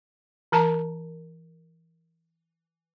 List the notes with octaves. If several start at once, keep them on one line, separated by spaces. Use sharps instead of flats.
E3 A#4 A5 A#5